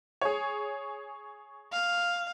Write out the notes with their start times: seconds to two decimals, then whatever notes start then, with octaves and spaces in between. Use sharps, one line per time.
0.21 G#4 C#5
1.72 F5